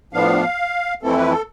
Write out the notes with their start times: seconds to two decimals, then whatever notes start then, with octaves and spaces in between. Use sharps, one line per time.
0.13 A2 F3 B3 D4 F5
1.02 F2 E3 A3 C4 E4 A4
1.17 B4
1.31 A4